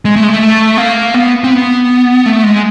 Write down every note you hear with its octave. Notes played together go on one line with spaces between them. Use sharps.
G#3
A3
G#3
A3
A#3
B3
C4
B3
A3
G#3